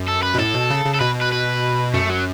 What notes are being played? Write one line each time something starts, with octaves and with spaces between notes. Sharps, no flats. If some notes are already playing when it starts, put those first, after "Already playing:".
Already playing: F#2
A4
B4
B2
A2 A4
B2
C#3
C#3
A4
B2 B4
B4
B4
F#2 A3
F#3